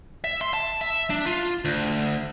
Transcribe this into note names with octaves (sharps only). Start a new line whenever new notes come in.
E5
C6
A5
E5
D4
F4
D2